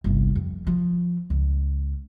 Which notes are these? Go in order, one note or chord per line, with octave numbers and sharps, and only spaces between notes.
G1 C2
F2
F3
C#2